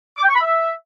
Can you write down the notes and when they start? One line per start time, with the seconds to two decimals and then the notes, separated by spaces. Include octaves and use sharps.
0.18 D6
0.23 G5
0.29 C#6
0.35 B5
0.41 E5